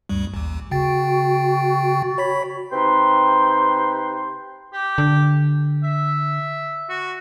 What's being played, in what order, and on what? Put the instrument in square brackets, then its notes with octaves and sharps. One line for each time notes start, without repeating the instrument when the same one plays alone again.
[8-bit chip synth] D2 G2 G3
A1 D#2
[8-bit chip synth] C#3 G5 A6 [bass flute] F#4
[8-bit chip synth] C#5 B5 B6
[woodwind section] C3 D#4 B4 G5 C6
[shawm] G4
[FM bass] D3
[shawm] E5
F#4